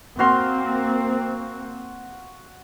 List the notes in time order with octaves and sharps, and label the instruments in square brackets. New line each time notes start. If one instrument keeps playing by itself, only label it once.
[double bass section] A#3 C4 [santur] F#4 F5 C6